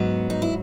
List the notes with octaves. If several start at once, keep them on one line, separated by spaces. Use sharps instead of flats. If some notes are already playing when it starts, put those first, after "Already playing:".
Already playing: G#2 F#3 B3
D#4
E4